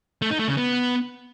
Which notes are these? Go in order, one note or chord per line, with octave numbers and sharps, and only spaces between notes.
A3
D#4
A3
C#3
B3